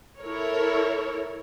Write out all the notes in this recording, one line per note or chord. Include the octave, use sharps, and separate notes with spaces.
E4 A4 A#4 C#5